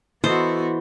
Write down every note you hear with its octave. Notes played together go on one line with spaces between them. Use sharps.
E3 B3 F4 F#4 A4 C5 D#5